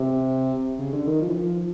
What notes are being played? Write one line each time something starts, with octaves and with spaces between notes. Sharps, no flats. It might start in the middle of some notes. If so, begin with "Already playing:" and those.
Already playing: C3
C#3
D3
D#3
F3
E3
F3